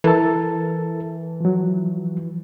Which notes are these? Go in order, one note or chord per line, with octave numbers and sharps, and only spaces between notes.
E3 A4 A#4 A5
F3 F#3